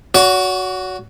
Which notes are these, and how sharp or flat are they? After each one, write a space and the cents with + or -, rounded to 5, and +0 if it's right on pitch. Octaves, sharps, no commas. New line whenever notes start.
F#4 +0 C#5 +45